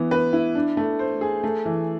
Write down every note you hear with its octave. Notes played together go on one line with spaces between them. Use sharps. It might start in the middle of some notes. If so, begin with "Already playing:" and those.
Already playing: E3 B3
B4
E4
D4
A3
C5
G#4
A3
E3